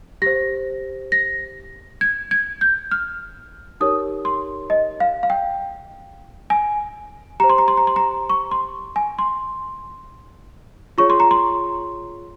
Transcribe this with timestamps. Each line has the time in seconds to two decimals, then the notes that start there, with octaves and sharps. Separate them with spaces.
0.22 G4 C5 A#6
1.12 A#6
2.01 G#6
2.31 G#6
2.61 G6
2.91 F6
3.80 D#4 G4 A#4 C#5 D#6
4.25 C6
4.70 D#5
5.00 F5
5.23 F5
5.30 G5
6.50 G#5
7.40 G4 C5 A#5
7.49 C6
7.58 A#5
7.68 C6
7.77 A#5
7.87 C6
7.96 A#5
8.30 C#6
8.51 C6
8.96 G#5
9.19 C6
10.98 F4 G#4 C#5 C#6
11.10 C6
11.20 A#5
11.31 C6